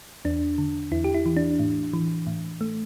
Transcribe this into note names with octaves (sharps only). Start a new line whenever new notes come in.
E2 D4
D3
E2 E4
G4
E4
E3
D4
A2
E3
A2
A3